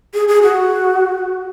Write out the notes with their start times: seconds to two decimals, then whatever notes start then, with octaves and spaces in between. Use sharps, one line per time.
0.14 G#4
0.28 G#4
0.43 F#4